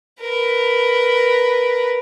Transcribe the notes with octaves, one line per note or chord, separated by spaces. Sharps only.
A#4 B4